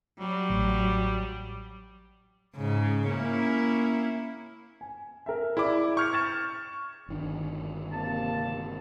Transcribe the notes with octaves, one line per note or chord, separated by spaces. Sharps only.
F#3 G3
A1
G#2 C#3
A#3 C#4 E4
G#5
A#4 E5
E4 G#4 D5 B5 D6
C#6 F6 G6 G#6 C#7
G#6 A6 E7
G1 D#3 D4
C3 A#3 A5